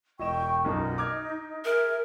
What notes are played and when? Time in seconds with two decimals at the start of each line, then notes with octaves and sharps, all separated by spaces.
0.20 E1 D#5 G5 C#6 E7
0.64 B1 F#2 A#2 D#4
0.98 D6 F6 G#6
1.65 G#4 A#4 E5